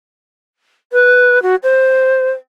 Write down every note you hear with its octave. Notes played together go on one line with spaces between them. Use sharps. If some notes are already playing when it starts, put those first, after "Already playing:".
B4
F#4
C5